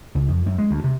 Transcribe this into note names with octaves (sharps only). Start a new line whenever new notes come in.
C#2
F2
F#2
G#3
D2
C3